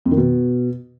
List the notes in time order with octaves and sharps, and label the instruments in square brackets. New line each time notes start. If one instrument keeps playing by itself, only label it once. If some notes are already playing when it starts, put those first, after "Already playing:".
[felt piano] F2
D#3
B2